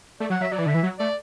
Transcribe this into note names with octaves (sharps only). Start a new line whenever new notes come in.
A3 D5
F#3 F#5
F#3 E5
F#3 D5
E3
D3 E5
E3
F#3
A3 D5